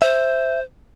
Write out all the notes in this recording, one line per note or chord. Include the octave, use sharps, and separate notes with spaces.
C5 E5